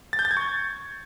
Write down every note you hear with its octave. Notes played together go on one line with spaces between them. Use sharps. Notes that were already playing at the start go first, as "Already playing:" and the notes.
A6
G6
A6
G#6
C#6